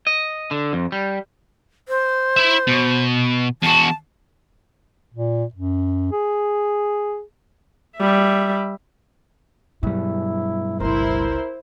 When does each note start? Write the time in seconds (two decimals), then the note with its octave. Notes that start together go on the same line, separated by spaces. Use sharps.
0.07 D#5
0.51 D3
0.73 F2
0.92 G3
1.89 C5
2.37 E4 E5
2.67 B2
3.62 E2 F#4 A5
5.14 A#2
5.54 F#2
6.12 G#4
7.97 G3 E5
9.83 G2 B2 F#3 G3 E4
10.80 G1 C#2 E4 A#4 C5